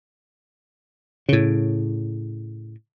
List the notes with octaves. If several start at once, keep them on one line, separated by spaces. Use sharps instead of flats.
A2 C#3